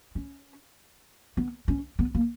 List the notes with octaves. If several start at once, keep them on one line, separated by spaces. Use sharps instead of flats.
C#4
B3
C#4
B3
A#3